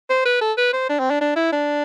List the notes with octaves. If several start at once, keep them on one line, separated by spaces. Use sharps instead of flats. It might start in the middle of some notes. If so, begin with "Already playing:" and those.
C5
B4
A4
B4
C5
D4
C4
D4
D4
E4
D4